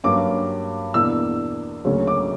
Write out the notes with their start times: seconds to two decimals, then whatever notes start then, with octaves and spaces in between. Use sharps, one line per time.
0.04 G2 F#3 A#3 C#4 D6
0.94 E2 B2 A#3 D4 E6
1.85 D2 C#3 F#3 A#3 C#4
2.07 D6